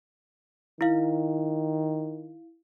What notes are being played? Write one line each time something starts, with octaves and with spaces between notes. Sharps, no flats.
D#3 E4 F5